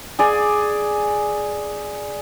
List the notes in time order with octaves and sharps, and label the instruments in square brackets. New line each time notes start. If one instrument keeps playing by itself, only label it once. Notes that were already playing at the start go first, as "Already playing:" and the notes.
[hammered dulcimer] G#4 D5 G#5